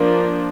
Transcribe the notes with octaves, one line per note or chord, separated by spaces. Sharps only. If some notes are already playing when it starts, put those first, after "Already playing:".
Already playing: F3 A#3 D4